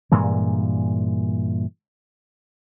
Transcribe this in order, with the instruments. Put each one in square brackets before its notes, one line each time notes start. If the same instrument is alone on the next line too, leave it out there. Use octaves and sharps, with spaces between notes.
[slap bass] G2 A#2 E3 G#3